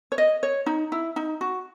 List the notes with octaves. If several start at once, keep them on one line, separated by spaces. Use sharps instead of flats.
C#5
D#5
C#5
D#4
E4
D#4
F#4